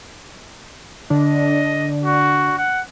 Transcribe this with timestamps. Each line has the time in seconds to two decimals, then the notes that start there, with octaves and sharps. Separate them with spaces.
1.10 D3 D4 D#5
2.04 F#4
2.57 F#5